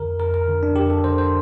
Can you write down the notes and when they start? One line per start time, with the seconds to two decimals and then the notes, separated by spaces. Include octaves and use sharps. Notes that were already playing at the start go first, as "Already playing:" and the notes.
Already playing: F2 D3 A#4
0.20 F2 A#4
0.34 A#4
0.48 D3
0.63 D4
0.76 F2 G4
0.90 A4
1.04 D3 C5
1.18 C5